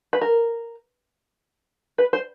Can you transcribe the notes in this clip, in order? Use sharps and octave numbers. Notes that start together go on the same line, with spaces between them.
B4
A#4
B4
C5